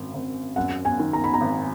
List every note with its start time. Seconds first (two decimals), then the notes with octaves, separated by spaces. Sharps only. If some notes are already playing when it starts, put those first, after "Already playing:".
Already playing: G#1 F#2
0.14 G#1
0.56 F#2 F#5
0.85 G#5
0.99 D#3
1.13 A#5
1.24 B5
1.34 A#5
1.41 G#1